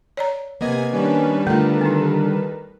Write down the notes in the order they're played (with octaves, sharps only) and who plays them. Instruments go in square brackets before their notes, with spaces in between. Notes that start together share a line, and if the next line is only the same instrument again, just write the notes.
[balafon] C#5 D5 A#5
[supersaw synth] C3 G#5 G#6 [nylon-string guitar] A#3 B3 D#5
[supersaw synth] D#3 G3 B4 [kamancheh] C#4 D4
[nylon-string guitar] D3 F4 [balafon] A3 [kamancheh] A4 A#4
[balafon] B3 D#4